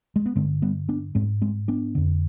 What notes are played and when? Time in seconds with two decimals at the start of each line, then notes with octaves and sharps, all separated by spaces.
0.16 G#3
0.26 B3
0.36 G2 D3 G#3 C4
0.62 G3 B3
0.89 B3 D4
1.15 G#2 G#3 C4
1.42 G#3 C4
1.68 B3 D4
1.95 F2 D3